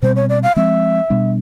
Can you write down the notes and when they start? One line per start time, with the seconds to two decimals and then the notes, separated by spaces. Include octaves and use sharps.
0.02 B2 G3 C4 C5
0.16 C#5
0.29 D5
0.43 F5
0.56 F3 G#3 C4 E5
1.10 B2 G3 B3 D4